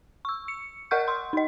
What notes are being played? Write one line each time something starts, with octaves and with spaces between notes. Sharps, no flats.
C#6 E6
C#7
A#4 D#5 F#5 C#6 F6 G6
C6
D#4 D#5